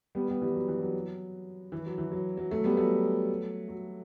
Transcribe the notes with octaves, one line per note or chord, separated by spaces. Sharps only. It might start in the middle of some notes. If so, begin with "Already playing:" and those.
G3 B3
G3 B3
E3 G3
F#3
E3
F#3
E3
F#3
E3
F#3
F#3
F#3 A3
G3 B3
F#3 A3
F#3